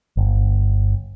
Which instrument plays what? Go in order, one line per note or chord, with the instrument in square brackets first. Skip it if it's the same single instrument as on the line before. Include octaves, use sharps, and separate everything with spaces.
[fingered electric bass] G1